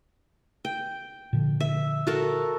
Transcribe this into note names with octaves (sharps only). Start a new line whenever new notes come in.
G5
A#2 D3 F3
E5
F#4 A4 A#4